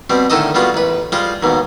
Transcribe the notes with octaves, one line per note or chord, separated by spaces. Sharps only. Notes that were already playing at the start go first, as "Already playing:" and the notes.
B2 G3 C4
A2 D3 D#3 A4 D#5
G3 G#3 B3 F4 F#4
A1 B4
G3 G#3 F4 C5
D#2 G#2 B2